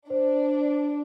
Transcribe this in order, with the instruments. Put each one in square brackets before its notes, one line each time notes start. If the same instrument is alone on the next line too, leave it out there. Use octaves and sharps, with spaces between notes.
[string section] D4 [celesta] C5